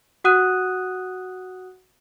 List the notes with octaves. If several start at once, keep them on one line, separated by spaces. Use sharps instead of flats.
F#4 F#5 D#6 F#6 D#7